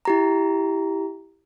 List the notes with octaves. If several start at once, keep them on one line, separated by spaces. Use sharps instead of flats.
E4 G4 A#5